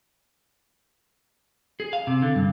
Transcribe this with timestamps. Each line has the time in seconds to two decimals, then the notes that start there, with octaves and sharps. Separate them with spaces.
1.80 G#4
1.93 F5
2.07 C3
2.22 D3
2.35 G2